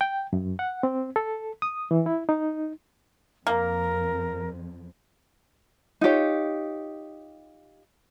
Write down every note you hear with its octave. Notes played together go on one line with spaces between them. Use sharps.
G5
F#2
F#5
C4
A4
D#6
E3
E4
D#4
F2 A#3 A#4
D#4 F4 G4 C#5